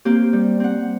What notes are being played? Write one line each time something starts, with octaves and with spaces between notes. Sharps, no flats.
A#3 C4 G4
G3
C4 F#5